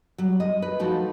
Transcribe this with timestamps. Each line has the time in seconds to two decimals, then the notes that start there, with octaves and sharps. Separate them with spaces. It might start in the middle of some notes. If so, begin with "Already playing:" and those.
0.18 F#3 G3
0.40 D#5
0.62 B4
0.79 F3 A3 D#4 F#4